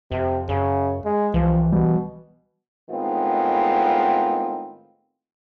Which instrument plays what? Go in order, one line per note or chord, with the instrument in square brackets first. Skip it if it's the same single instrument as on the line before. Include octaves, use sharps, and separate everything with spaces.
[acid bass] F2 [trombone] C3
[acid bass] F#2 [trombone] C#3
[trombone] G#3
[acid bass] C2 [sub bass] E3 [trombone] F3
[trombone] B2 [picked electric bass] G3
[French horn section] A2 D#3 G#3 B3 C4 F4